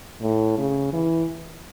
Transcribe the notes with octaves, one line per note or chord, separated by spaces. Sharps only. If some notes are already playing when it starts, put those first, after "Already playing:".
A2
C#3
E3